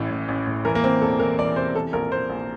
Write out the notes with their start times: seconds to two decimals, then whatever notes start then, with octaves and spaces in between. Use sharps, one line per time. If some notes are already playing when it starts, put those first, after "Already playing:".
Already playing: A1 A2 E3
0.11 A1
0.28 A1
0.47 A2
0.65 E3 A#4
0.75 A#3
0.84 E3 C4
1.01 E1 A4
1.20 E3 A#4
1.38 E3 D5
1.56 C3 C5
1.75 E3 A4
1.93 A#1 A#4
2.11 A#1 C5
2.30 A#1